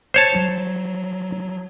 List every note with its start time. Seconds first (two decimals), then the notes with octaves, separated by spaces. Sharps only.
0.14 C5 C#5 A5
0.35 F#3 G3